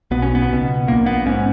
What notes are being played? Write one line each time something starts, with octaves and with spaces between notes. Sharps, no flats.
B1 B2 B3
C#4
B3
C#2 B2
A#1 A#2 A#3
B3
G#2 C#4